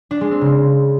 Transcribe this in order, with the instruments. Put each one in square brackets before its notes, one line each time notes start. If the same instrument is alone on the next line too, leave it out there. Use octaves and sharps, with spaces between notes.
[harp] D4
G#3
C4
C#3